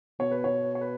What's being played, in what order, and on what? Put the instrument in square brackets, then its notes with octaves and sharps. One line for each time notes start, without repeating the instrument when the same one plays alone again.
[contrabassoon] B2 [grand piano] C#5
[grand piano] B4
C#5
C#5
B4